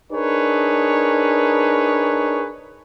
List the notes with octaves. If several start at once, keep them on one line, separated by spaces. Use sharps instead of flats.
D4 D#4 G#4 A#4 B4 C#5